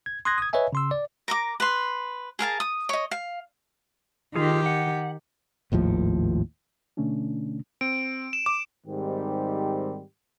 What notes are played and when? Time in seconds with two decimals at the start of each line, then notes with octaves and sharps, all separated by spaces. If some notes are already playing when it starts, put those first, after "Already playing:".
0.06 G#6
0.25 C6 D#6 F#6 G#6 A#6
0.38 D#6 G#6
0.53 B4 C#5 D#5 E5 G#5
0.73 C#3 C6 E6
0.91 D5
1.28 A#4 A#5 D6
1.60 B4 C6
2.39 G#4 A#4 F5 A5
2.60 D#6
2.89 C#5 D#5
3.11 F5
4.36 D#3 F4 G4 G#4
4.66 F#5
5.72 G#1 D#2 A2 F3
6.97 B2 D3 A3 C#4 D4
7.81 C4 D7
8.33 E7
8.46 D6 E7
8.87 G#2 D#3 G3 C4 G4